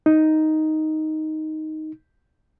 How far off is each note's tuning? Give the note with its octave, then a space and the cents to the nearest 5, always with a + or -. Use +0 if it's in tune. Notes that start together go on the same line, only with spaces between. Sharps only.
D#4 +5